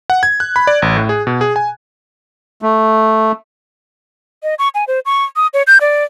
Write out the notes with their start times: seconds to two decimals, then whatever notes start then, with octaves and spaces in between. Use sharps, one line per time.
0.10 F#5
0.23 G#6
0.40 F#6
0.56 B5
0.67 D5
0.82 A1
0.97 A2
1.09 G#4
1.27 B2
1.41 G#4
1.56 G#5
2.62 A3
4.43 D#5
4.59 C#6
4.74 G#5
4.87 C5
5.05 C#6
5.36 D#6
5.53 C#5
5.67 G6
5.81 D5